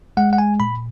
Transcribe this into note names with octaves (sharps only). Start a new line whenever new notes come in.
G#3 F#5
F#5
G#5
A#2 B5